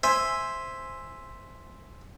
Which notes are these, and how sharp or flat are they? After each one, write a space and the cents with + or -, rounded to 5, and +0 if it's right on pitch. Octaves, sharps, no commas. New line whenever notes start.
C5 +0 E5 +0 G#5 +0